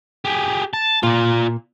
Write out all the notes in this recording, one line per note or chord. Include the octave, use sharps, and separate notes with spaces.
G4 G#4
A5
A#2 F4 D5